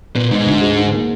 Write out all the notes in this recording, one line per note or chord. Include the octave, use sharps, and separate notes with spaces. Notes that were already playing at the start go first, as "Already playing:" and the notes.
A#2 B3
G#2 D#3
D2
G#3
D#3
A#3